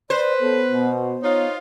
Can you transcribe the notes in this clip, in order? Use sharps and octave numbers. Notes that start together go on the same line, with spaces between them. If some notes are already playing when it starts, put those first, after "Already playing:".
B4 C5 D5
B3 A4 C#5
B2
D#4 F4 C#5